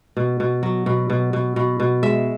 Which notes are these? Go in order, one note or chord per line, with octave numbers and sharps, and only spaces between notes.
B2
B2
F#3
B2
B2
B2
B2
B2
G#3 E5